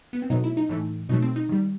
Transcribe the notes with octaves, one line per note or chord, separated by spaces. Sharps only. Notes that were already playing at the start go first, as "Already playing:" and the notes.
B3
C4
B2 F#3 A3 D#4
E4
D#4
A2 E3 A3
B2 F#3 A3 D#4
C4
D#4
D#3 G3